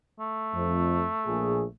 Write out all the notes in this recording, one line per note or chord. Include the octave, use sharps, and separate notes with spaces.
A3
F2
A#1 A#2 G#4